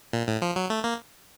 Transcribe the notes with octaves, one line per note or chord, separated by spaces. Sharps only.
A#2
A2
F3
F#3
A3
A#3